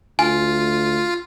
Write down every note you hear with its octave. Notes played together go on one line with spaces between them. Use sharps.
D2 F4 G#5